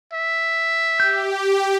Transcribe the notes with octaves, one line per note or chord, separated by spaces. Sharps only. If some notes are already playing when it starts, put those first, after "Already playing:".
E5
G4 G6